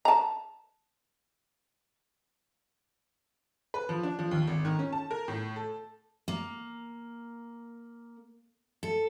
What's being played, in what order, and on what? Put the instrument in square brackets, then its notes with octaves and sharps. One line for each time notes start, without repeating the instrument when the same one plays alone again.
[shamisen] A5 A#5
[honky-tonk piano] B4
F3
D4
F3
D#2
G#1
D#3
C#4
A5
A#4
A2
A4
[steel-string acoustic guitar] A#3
A4